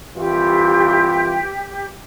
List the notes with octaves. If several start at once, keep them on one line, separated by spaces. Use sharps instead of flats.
C2 E3 F4 G4